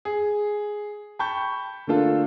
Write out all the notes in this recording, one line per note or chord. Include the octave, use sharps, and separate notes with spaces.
G#4
G5 A5 B5 C#6 G6
D3 A3 A#3 D4 F4 A4